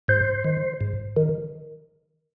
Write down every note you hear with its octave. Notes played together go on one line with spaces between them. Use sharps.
G#2 C5
D#3
G#2
D#3